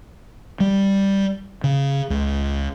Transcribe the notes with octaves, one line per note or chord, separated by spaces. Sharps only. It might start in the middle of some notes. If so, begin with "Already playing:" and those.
G3
C#3
C#2